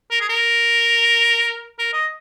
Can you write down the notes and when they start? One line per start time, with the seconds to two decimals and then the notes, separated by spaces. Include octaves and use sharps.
0.11 A#4
0.20 G#4
0.29 A#4
1.79 A#4
1.93 D#5